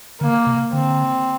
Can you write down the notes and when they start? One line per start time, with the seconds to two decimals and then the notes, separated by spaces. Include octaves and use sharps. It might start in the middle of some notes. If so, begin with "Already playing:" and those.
0.21 D3 A#3
0.47 C3
0.73 D3 C4